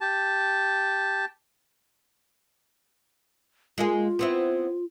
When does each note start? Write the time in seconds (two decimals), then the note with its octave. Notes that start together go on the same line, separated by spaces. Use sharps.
0.01 G4 A5
3.78 G#3 A#3 F4 G#4
4.19 B3 C4 E4